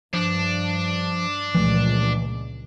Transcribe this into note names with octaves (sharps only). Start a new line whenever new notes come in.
G2 F3 D4
C#2 A#2 E3 F3 A3